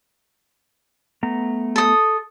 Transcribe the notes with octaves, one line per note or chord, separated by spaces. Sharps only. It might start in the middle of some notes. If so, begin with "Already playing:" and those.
A3 B3 A#5
A4 D#6